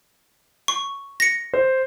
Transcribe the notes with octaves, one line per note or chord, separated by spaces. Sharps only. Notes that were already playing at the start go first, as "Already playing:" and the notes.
C#6
A#6 C#7
C5